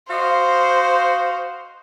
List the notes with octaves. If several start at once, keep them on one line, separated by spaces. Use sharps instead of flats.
F#4 C5 D#5 F5